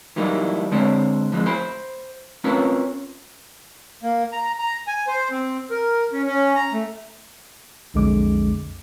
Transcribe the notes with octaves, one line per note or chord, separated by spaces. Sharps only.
E3 F#3 G3 A#3 D#4 E4
D3 G#3 C4 D4 C5 C#5
F2 E3 G#3
C5 G#5 B5
C4 C#4 F4 A#4 B4 C#5
A#3
A#5
A#5
G#5
C5
C4
A#4
C#4
C#4
A#5
A3
B1 F2 D3 G#3 D6